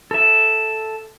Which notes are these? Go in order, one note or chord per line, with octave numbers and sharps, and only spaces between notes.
A4 E5